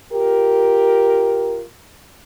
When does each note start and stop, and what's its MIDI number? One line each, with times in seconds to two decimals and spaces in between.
0.12 1.62 65
0.12 1.62 67
0.12 1.62 70